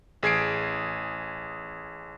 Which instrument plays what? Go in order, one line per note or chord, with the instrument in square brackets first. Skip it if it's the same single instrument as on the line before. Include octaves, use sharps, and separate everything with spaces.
[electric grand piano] A1 G#4 G#6 C7 D7